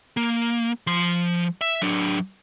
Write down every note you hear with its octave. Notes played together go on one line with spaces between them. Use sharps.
A#3
F3 C6
E5
F#3 D4